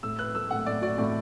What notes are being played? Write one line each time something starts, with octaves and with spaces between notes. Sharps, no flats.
A2 E6
B4 F#6
A3 E6
A2 F#5
A2 D5
F#4 D5
A2 D5